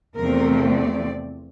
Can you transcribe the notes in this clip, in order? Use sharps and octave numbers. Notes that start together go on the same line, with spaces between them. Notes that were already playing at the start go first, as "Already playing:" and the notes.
E2 C3 F3 A3 C4 A#4
D5